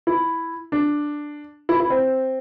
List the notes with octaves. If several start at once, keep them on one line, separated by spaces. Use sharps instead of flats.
E4
D4
E4
E4
C4